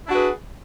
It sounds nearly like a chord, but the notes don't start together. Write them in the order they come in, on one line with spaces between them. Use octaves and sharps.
E4 D4 F#4 B4 G#4